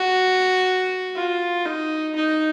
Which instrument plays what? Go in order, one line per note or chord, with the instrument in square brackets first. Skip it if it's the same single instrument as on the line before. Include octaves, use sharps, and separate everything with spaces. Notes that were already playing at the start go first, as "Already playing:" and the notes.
Already playing: [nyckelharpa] F#4
F4
D#4
D#4